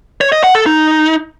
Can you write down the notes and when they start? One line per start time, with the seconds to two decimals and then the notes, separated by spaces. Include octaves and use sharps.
0.21 C#5
0.32 D#5
0.44 F#5
0.55 A4
0.66 D#4